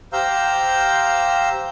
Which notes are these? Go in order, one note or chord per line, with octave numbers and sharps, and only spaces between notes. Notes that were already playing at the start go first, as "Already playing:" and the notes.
G4 C5 F5 A#5 E6 G6